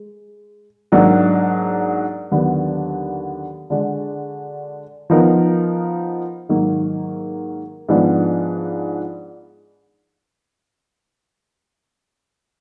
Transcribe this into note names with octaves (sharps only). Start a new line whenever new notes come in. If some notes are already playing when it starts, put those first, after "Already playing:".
Already playing: G#3
G#2 F#3 A#3 D4
D#2 D3 F#3 B3 D4
D3 G#3 D4 F#4
F3 B3 D#4 A#4
G#2 D#3 F#3 A#3
G#2 F3 G#3 B3 D4